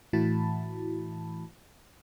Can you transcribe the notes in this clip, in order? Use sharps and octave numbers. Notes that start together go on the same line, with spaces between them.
A2 E3 E4 F#4 A5 B5